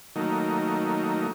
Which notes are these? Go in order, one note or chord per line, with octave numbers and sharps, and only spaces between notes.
D#3 F#3 A3 A#3 D#4